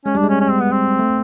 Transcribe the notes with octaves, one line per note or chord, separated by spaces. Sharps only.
G#3 C#4
G3 D4
G#3
C#4
C#4
C4
B3
C4
A3